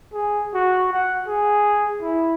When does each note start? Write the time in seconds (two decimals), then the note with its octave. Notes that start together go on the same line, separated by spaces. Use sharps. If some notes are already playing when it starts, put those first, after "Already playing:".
0.13 G#4
0.54 F#4
0.93 F#5
1.28 G#4
2.02 E4